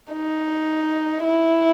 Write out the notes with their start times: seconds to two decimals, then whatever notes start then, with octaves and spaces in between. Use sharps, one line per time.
0.13 D#4
1.24 E4